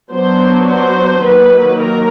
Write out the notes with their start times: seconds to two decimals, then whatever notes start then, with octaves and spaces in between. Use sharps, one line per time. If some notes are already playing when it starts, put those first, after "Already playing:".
0.12 F#3 B3 D4 C5
0.67 C5
1.23 D#3 F#3 A#3 B4
1.79 A#4